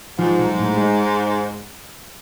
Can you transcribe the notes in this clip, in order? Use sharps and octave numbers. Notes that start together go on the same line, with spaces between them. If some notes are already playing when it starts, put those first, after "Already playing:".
G#2 F3
B1
A2
G#3